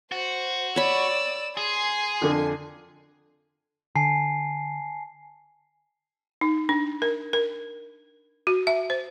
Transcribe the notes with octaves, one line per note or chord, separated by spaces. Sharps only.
F#4 C5
C#5 D5 B5 E6
G#4 G#5 C6
F2 D3
D3 G#5 A5 C7
D#4
D4
A#4
A#4
F#4
E5
C5